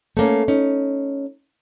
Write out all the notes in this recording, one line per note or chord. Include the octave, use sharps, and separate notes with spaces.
A3 A#3 C#4
C#4 D#4